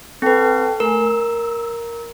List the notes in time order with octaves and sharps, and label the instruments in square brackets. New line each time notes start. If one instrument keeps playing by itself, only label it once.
[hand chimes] C4 B4 [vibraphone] A4 G5 A5
[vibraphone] A3 G#5 [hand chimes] A#4
[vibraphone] E6